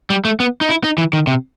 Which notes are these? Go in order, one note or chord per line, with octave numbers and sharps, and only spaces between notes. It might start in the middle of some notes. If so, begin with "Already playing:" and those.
G3
A3
B3
D#4
E4
D#4
E3
D#3
C3